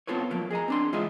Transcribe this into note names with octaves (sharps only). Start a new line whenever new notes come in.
B3 C4 F4 A4 B4 C#5
F3 F#3 A3 A#3
G#4 D#5 G#5 A#5
C4 D4 C6
E3 G#3 F4 G#4 D#5 E5